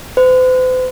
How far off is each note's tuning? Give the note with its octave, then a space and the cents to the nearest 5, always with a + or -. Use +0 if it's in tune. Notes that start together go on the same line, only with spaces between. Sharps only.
C5 -45